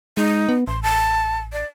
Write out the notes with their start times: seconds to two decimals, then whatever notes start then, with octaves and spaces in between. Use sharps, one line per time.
0.17 G#3 D#4
0.49 B3
0.67 A1 C6
0.83 A5
1.53 D5